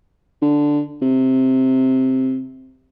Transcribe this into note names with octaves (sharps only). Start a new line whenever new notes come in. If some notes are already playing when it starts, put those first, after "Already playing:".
D3
C3